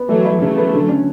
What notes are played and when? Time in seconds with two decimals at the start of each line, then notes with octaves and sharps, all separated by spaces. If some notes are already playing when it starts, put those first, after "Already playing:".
Already playing: B3
0.09 E3 F#3 A3
0.25 E4
0.41 C#3 F#3 A3
0.57 B3
0.73 D3
0.89 C#4